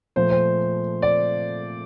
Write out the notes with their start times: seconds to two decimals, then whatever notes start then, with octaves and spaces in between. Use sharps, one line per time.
0.16 A#2 F3 A3 C5
0.31 C5
1.02 D5